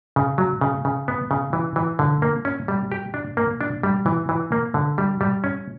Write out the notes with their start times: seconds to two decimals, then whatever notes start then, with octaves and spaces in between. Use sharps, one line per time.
0.16 C#3
0.38 F#3
0.61 C#3
0.85 C#3
1.08 B3
1.31 C#3
1.53 E3
1.76 E3
1.99 D3
2.22 A#3
2.45 C#4
2.68 G3
2.92 G4
3.14 D4
3.37 A#3
3.61 D4
3.83 G3
4.06 E3
4.29 E3
4.52 A#3
4.74 D3
4.98 G3
5.21 G3
5.44 C#4